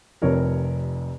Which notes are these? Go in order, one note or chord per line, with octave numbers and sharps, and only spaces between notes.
F1 F2 C3 A#4 C#5